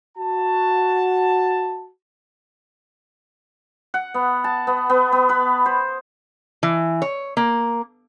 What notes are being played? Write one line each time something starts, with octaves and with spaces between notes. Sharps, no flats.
F#4 A5
F#5
B3
A5
B3
B3
B3
B4
C5
E3
C#5
A#3